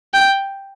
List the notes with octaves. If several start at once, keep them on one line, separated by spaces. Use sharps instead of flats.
G5